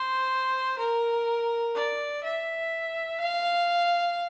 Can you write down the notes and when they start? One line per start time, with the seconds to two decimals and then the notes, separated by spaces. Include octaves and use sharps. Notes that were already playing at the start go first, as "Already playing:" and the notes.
Already playing: C5
0.78 A#4
1.75 D5
2.23 E5
3.20 F5